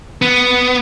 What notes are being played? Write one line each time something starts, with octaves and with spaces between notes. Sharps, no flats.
B3